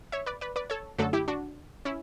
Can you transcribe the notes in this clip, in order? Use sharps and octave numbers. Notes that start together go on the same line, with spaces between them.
C#5 E5
B4 D5
B4 D5
B4 D5
A4 C#5
F#2 D3 F#3 A3 F#4 A4
E4 G4
D4 F#4
C#4 E4